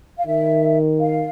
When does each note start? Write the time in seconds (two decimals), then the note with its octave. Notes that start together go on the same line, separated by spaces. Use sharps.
0.18 F5
0.27 D#3 E5
1.00 F5